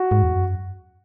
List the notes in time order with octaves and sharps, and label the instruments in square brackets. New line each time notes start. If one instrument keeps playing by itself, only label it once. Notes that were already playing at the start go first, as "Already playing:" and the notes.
Already playing: [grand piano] F#4
[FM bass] G#2
E2
F#2